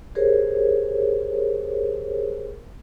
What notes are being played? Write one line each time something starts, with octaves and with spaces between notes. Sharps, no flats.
G4 G#4 A#4 C5 C#5